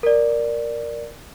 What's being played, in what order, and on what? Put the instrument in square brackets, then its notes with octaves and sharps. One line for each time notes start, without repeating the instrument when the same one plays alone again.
[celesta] A#4 D5